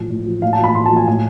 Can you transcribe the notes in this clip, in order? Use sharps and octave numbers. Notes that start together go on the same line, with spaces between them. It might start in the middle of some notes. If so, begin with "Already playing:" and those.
Already playing: A2 F3
A2
F3
A2 F5
A5
F3
B5
A2 C6
A5
F3
G#5
A2 G#5